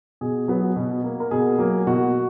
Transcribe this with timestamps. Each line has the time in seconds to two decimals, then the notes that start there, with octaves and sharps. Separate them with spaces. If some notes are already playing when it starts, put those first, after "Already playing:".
0.21 B2 G#4
0.48 F#3 B3
0.76 B2
1.04 A#3
1.20 A#4
1.31 B2 G#4
1.58 F#3 A#3
1.87 B2 F#4